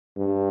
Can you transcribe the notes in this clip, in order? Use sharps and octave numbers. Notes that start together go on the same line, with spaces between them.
G2